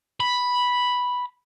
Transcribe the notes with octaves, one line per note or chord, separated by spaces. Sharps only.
B5